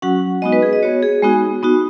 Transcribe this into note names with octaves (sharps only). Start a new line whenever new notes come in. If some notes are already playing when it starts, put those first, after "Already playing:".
F#3 C#4 F#4 F#5
G#3 B3 D#4 F#4 D#5
B4
G#4
D#5
B3 F#4 C#5
G#4
G#3 B3 D#4 F#4
B3 D#4 F#4